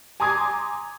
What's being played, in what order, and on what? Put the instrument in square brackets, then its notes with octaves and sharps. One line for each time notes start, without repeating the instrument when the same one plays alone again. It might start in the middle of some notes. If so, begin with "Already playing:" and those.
[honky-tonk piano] G#5 A#5 C6 D6 D#6 G#6